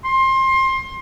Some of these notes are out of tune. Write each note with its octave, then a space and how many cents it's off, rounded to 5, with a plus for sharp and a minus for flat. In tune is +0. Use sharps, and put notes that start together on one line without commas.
C6 +25